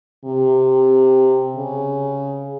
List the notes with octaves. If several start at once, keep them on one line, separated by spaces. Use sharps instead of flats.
C3
C#3